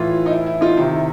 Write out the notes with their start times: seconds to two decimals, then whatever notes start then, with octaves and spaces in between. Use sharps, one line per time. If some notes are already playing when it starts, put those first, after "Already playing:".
Already playing: A2 E3 F4
0.26 D#4
0.30 E4
0.46 E4
0.61 D#4 F4
0.77 C3 D#3 E4